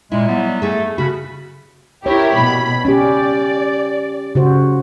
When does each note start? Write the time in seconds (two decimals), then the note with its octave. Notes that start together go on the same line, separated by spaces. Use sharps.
0.12 A#2 G#3 E4
0.28 F#3 G3 B3
0.62 A3 G#4 A4
0.98 C#3 F#4 B5
2.06 E4 G4 A#4 C#5
2.35 B2 B5
2.85 C#4 G4 D5
4.35 C#3 F#4 C5